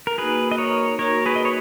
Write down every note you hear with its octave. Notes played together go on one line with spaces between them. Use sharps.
A#4
A#3 D#4 F#4 G#4 B4
D#5
A#4 C#5
A#3 D#4 F#4 A#4 C#5
G#4 B4
D#5
C#5